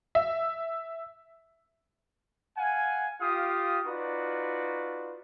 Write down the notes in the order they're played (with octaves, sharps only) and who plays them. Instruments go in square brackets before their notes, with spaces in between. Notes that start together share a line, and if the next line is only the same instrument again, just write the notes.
[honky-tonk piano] E5
[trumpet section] F5 F#5 G#5
F4 G4 F5 D#6
D#4 F4 F#4 B4 D5